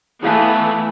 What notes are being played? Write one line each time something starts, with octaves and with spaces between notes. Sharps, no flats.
E3 A3 B3 E4 F5 A5